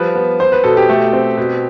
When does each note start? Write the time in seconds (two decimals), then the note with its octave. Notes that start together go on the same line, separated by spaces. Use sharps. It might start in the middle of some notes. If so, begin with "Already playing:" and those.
Already playing: F3 G3 B4
0.15 B3
0.39 B3 C5
0.52 B4
0.64 B2 A4
0.77 G4
0.89 A3
1.13 C4
1.37 B2